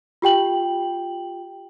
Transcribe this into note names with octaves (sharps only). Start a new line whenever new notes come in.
F4 G4 G5 F#7